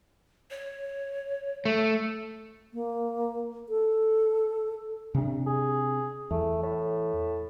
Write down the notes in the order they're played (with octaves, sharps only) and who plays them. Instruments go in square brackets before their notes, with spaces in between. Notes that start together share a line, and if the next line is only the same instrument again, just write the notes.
[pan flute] C#5
[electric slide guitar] A3
[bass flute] A#3
A4
[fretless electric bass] C3 D4
[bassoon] G#4
[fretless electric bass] E2 [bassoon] A3
[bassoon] A2